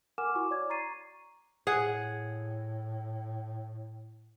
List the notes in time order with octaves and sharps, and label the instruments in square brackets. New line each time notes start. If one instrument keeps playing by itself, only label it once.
[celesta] A#4 F#5 G#5 D6 F6 E7
E4 F#4 G#5 C#6 D6
C#5 D5 D6 G#6
A#5 C#6 A6 C7 D#7
[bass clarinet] A2 [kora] G#4 F#5